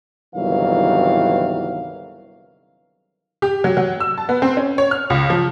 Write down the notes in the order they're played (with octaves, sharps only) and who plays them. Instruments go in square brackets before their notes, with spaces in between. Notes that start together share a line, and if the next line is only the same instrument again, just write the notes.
[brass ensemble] G1 C2 D#3 E3 F#3 F5
[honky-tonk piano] G4
F#3
F#3
E6
A5
B3
C4
C#4
C#5
F6
C#2
F3